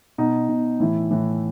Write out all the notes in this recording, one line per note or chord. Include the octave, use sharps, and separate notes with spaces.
B2 D#4
B2
A2 E3 E4
A2 E3